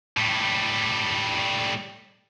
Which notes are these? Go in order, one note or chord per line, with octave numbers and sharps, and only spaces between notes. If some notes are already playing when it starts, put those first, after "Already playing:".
A2 G3